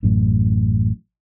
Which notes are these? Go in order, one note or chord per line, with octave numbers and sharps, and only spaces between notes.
A1 F#2 A2